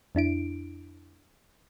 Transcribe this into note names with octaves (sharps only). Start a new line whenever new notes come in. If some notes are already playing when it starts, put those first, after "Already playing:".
F2 D4 E4 D7